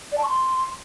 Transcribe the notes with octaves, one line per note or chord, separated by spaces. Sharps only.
D5
A5
C#6
C6